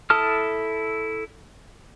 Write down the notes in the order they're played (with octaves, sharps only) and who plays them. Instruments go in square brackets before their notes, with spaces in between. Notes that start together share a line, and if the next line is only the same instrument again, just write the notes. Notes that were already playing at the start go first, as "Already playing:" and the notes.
[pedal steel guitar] E4 A4 A5 D#6 F6